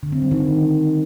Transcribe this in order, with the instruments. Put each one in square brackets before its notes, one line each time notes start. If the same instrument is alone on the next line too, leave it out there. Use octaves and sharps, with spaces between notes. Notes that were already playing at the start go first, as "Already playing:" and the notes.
[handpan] D3
C4
G3
D#3